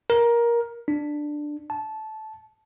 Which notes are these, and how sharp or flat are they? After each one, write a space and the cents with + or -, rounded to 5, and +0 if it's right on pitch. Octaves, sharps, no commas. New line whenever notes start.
A#4 +15
D4 +10
A5 -15